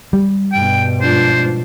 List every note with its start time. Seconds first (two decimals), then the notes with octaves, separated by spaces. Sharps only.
0.13 G3
0.52 G2 B2 G5
1.01 G#2 F3 D4 C5